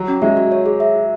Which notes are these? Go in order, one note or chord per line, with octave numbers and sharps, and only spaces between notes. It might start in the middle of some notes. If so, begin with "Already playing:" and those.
Already playing: F#3
C#4
G#3 E5
F#4
C#5
G#4
E5
F#4